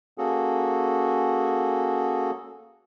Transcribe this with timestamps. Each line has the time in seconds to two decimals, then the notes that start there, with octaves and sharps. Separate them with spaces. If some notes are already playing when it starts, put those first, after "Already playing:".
0.18 A#3 C#4 F#4 G#4 A4